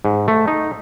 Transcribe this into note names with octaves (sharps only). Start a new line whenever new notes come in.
G#2
A3
D#4